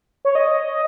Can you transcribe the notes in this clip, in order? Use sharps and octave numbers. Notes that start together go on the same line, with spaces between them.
C#5
D#5